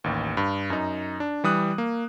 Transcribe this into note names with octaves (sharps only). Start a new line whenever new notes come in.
A1 D#2
G2
F#2 D#4
D4
E3 G3 D#6 F#6
A#3